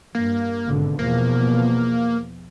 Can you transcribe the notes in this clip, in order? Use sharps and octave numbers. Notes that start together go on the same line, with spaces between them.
G2 A#3
G#1 B2 D3
E2 B2 F3 A#3